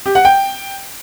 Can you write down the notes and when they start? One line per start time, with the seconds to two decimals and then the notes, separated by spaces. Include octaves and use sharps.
0.06 G4
0.15 F#5
0.25 G5